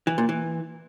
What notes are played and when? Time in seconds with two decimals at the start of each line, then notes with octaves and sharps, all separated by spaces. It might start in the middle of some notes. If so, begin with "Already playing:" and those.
0.07 E3
0.18 A#2
0.29 E3